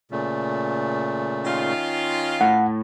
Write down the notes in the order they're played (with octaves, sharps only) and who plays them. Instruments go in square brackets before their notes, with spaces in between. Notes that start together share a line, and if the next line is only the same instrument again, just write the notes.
[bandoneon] A#2 C#3 A3
[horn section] D#3 C#4 F4
[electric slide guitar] A2 [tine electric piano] F#5